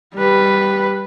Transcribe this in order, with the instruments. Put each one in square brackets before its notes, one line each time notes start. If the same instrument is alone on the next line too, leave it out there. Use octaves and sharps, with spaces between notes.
[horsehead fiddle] G3 B4